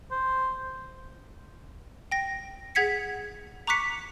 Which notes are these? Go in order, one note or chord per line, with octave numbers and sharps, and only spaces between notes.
C5
G5 A#6
G#4 F#5 G#6 B6 C#7
A#5 C#6 D6 F#6 B6 C#7